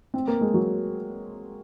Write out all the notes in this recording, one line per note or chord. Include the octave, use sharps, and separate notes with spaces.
C4
A#3
G#3
F#3